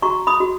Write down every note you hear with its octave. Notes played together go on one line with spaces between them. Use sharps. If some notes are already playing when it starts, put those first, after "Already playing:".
F#4 A#5 C#6
B5 D#6
F#4